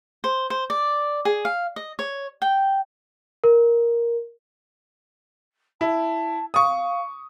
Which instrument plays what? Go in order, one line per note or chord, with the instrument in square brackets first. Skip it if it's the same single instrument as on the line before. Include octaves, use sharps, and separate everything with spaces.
[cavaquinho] C5
C5
D5
G#4
F5
D#5
C#5
G5
[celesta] A#4
[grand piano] E4 [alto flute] A5
[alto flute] F5 [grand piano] C#6 D#6